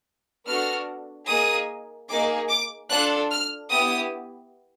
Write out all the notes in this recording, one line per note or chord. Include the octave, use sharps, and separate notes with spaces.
B3 D4 F#4 A4 F6
A#3 D#4 G#4 D#6
A#3 D#4 G#4 D6
D6
D4 F4 A4 F#6
F6
B3 E4 G4 D#6